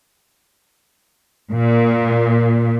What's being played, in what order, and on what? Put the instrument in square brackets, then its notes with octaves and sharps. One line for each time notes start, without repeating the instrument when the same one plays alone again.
[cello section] A#2